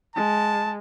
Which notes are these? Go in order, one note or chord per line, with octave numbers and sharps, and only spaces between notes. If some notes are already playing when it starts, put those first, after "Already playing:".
G#3 A5